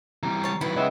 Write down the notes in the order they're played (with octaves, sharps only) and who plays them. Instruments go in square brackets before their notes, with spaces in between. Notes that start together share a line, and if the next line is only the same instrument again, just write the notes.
[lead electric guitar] E3 G3 [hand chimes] C4 A#5
[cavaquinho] C#5 A5 [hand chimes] C7
[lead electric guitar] D#3 F#3 [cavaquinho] E4 B4
[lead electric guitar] C#3 G#3 [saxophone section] B3 E5 [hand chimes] C#5 D#5 G5